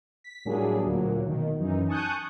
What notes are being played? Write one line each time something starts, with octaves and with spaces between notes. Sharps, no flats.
B6
A2 F#3 G3 A#3 D4 G#4
D2 A#2 F#3 A#3
B2 D#3
F#2 E3 D#4
G#5 A5 C#6 D#6 F#6 G6